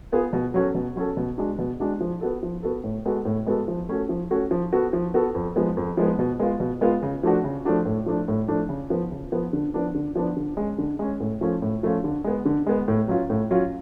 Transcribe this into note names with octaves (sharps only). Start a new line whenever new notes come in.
B3 F4 G#4
B2
F#3 C#4 F#4 A4
B2
F#3 C#4 F#4 A4
B2
G#3 D4 F#4
B2
G#3 D4 F#4
F3
B3 F#4 A4
F3
B3 F#4 A4
A2
G#3 B3 F#4 A4
A2
G#3 B3 F#4 A4
F3
A3 C#4 F#4 A4
F3
A3 C#4 F#4 A4
F3
B3 F#4 A4
F3
B3 F#4 A4
F2
F3 G#3 B3
F2
F3 G#3 B3
B2
G#3 B3 F4
B2
G#3 B3 F4
C#3
F3 A3 D4 F#4
C#3
F3 A3 D4 F#4
A2
F3 A3 D4
A2
F3 A3 D4
C#3
F3 B3
C#3
F3 B3
D3
F3 B3 D4
D3
F3 B3 D4
D3
G#3 C#4
D3
G#3 C#4
A2
F3 A3 C#4 F4
A2
F3 A3 C#4 F4
D3
G#3 B3
D3
G#3 B3
A2
F#3 C#4 F4
A2
F#3 C#4 F4